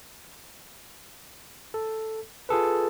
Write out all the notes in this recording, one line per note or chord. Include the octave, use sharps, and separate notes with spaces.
A4
F4 G#4 A4 B4